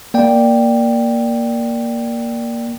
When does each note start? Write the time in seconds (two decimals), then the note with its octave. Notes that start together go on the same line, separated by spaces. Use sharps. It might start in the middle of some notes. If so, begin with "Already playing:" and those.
0.14 A#3 D5 G5